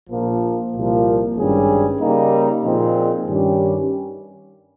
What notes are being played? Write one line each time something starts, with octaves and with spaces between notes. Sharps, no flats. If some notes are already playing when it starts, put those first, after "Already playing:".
A#1 A#2 F3 A#3
C2 A#2 F3 A#3
G#1 G2 G3 C#4 G#4
C#3 G3 A#3 D#4
A#2 F3 C4 D#4 G#4
G2 D#3 G3 C#4 G4